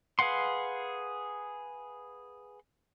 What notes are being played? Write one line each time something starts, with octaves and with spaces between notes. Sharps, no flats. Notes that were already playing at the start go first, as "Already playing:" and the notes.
G#4 B4 F5 F#5 C6